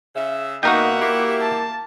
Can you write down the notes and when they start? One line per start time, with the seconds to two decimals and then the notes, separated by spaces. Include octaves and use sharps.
0.15 C#3 E5
0.63 B2 A#3 D#4 F#4 A#4 E5 F#5 G5
1.01 A#3 E4 G4
1.41 A5